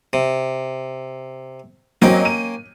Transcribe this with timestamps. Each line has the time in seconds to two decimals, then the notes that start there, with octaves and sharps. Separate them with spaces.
0.13 C3
2.02 F#3 A#3 C4 C#4 D#5 G5
2.25 D#7